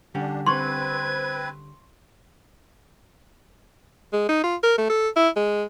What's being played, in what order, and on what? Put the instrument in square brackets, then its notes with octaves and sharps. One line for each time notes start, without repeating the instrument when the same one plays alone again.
[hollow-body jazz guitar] D3 G3 C#4 [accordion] D4
[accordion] C4 B4 [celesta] C6 C#6 [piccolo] G#6
[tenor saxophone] G#3
D#4
F4
A#4
A3
A4
E4
G#3